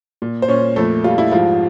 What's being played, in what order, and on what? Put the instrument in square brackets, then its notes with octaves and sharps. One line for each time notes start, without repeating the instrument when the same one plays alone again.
[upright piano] A#2
C5
A#2 C#4 C#5
F2 A3 A4
G3 F4
E4
G#2 F3 F4